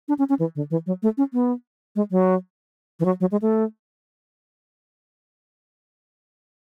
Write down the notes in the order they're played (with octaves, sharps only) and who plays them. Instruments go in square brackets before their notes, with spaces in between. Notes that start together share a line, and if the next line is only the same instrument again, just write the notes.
[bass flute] D4
C#4
C#4
E3
D3
E3
F#3
A3
C#4
B3
G#3
F#3
E3
F#3
F#3
G#3
A3